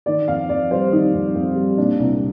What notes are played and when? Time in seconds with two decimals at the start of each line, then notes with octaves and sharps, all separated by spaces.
0.06 D#3 D5
0.28 F2 F5
0.49 F2 D5
0.71 G3 C5
0.92 D#3 D#4
1.14 F2
1.35 F2
1.56 G3
1.77 A#2 D4
2.00 C2